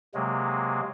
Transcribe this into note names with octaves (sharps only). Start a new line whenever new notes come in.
C3 F#3 G#3 A#3